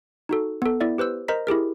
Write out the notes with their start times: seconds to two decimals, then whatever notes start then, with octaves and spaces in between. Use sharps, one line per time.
0.29 D#4 F#4 A4
0.62 B3 A4
0.80 B3 E4 D5 E5
0.98 G4 B4 C5 E6
1.28 A#4 C5 D#5 A#5 B6
1.47 E4 G4 G#4 A#4